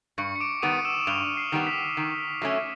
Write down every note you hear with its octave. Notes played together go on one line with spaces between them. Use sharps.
G2 C#6 C#7
C#7
D6 D7
D#3 G3 B3 D#6 D#7
E6 E7
G2 F6 F7
C7
D#3 G3 B3
B6
D#3
F#3 A3 C#4